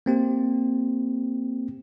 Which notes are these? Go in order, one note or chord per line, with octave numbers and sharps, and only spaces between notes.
A#3 C4 G4